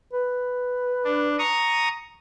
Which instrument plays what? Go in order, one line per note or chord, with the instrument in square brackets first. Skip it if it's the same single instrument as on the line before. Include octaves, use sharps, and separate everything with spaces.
[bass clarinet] B4
[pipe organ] D4
A#5 C#6 D#6